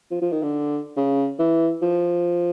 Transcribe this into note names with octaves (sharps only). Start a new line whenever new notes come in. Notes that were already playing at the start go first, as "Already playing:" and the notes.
F3
F3
D#3
D3
C#3
E3
F3